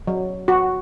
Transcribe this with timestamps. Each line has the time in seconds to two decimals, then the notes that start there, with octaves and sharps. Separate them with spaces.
0.07 F#3
0.48 F#4